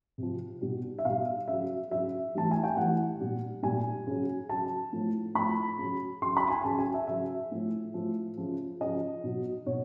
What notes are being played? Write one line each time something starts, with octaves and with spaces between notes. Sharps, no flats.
C3 F3
B2 G3
E5
B2 G3 F5
C#3 F#3 E5
C#3 F#3 E5
A2 E3 G3 A5
G#5
G5
A2 E3 G3 F#5
A#2 G3
A#2 G3 G#5
C#3 F#3
C#3 F#3 A5
A2 F3
A2 F3 B5
C#3 F#3
C#3 F#3 C6
B5
G#5
C#3 F#3 A5
G#5
E5
C#3 F#3 E5
A2 F3
A2 F3
C#3 F3
C#3 F3 D#5
B2 F#3
B2 C#5